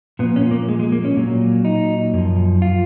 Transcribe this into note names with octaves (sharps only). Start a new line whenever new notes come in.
A#2 F3 B3
C#4
A#3
G#3
G#3
A#3
C#4
A#2 F#3
D#4
F#2 F3
F4